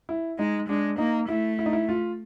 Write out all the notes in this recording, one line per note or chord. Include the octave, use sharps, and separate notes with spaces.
E4
G#3 D#4
G#3 D4
A#3 D#4
A3 E4
E4
D#4
E4
F4